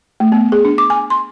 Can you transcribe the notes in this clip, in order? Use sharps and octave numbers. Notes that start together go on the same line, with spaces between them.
A3
B3
G#4
D4
D6
G#5
C6